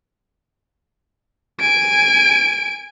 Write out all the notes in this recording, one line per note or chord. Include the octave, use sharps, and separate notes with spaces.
G#5 D7